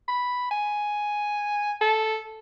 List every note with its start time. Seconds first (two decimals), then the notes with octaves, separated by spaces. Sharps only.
0.08 B5
0.51 G#5
1.81 A4